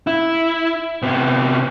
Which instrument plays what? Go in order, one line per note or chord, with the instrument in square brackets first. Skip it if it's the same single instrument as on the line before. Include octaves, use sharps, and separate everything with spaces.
[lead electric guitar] E4
C3 B3